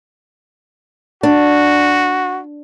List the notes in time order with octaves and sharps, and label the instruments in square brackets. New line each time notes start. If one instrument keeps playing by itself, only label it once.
[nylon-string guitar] D4 [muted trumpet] F#4